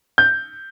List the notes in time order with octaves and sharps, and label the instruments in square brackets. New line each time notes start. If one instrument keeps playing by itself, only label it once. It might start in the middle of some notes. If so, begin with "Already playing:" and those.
[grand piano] G6